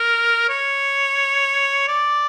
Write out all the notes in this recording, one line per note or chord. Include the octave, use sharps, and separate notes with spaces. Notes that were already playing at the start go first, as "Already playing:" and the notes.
Already playing: A#4
C#5
D5